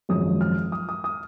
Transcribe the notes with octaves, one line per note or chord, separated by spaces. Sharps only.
G#1 F#2 F3 G#3 D#6
F6
D#6
D#6
D#6